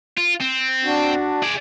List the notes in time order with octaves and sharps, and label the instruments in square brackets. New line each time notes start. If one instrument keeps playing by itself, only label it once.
[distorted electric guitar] F4
C4
[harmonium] D4 F#4
[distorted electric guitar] G#4 D5